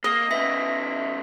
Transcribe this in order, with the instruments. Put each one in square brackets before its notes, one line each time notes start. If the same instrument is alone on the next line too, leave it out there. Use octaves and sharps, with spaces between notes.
[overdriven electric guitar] A#3 [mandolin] D#5
[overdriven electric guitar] C#3 B3 [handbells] E5 A#6